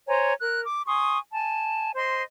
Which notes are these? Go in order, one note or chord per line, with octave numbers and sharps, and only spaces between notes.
C5 C#5 G#5 A#5
A#4 F#6
D6
G#5 C6 C#6 D#6
G#5 A5
C5 D#5 C6